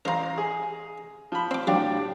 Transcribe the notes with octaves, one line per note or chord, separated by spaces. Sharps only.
A1 A#4 C5 F5 A#5
G#4
F3 B5
C4 D6
A2 F3 F#3 D4 G4